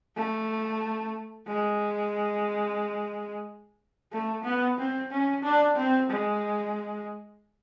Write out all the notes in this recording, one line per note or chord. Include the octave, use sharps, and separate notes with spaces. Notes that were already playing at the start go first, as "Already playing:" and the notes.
A3
G#3
A3
B3
C4
C#4
D4
C4
G#3